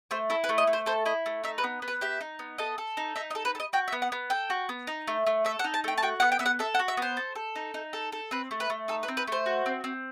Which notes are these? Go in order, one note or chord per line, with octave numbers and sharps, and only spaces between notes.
A3 C5
E4 A4
B4
A3
D#5
A3
C5
A4 C5
E4 D#5
A3
D#4 E5
B4
B3
B3
B4
G4 E5
D#4
B3
A4 D#5
A4
D#4
D#4 E5
D#5
A4
B4
A4
D#5
F#4 G5
E5
B3
F#5
B3
A4 G5
F#4
B3
D#4
A3
A3
A4 E5
F#5
D#4
A5
A3 G5
A5
F#4 G5
B3 F#5
G5
B3 E5
F#5
A4 E5
F#5
F#4
E5
B3 C5
A4
A4
D#4
D#4
A4
A4
C4 B4
A3
B4
A3
D#4 A4
B4
C4
B4
A3 C5
F#4
C4
C4